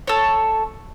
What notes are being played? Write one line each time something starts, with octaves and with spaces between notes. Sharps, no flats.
A4 C#5